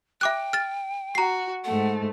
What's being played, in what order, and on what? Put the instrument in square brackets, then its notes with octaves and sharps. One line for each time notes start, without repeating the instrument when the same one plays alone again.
[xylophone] E5 D6 F#6 [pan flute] G5
[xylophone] F6 A6
[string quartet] F#4 [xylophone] A#5 C7
[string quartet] G#2 A3 [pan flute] F#5